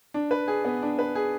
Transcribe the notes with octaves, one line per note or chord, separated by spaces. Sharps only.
D4
B4
G#4
B3
D4
B4
G#4